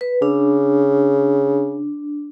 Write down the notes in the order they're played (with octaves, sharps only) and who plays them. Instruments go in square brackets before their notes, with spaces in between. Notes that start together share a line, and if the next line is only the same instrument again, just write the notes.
[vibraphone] B4
[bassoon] C#3 [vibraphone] D4